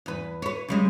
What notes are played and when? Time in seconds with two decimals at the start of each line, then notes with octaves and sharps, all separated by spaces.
0.06 E2 B4
0.42 B4 C#5
0.68 C#3 G3 G#3